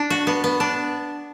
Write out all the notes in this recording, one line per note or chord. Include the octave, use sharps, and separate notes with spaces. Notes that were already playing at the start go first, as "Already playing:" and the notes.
Already playing: D4
F#4
B3
B3
D4